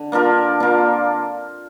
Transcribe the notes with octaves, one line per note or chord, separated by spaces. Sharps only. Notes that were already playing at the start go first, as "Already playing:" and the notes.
Already playing: D3
A#3 D4 F4 A#4
A#3 D4 F4 A#4